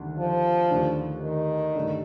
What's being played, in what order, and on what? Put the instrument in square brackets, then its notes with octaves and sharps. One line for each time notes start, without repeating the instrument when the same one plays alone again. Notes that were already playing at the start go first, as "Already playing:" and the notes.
Already playing: [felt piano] D2 C3 D#3 G3 D4
[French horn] F3
[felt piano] D#2 D3 A3 D4
[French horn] D#3
[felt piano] G2 D3 A3 D4